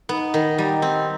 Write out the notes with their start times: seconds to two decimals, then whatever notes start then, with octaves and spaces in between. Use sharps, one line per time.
0.09 B3 D#4
0.34 D#3
0.58 G3
0.82 C4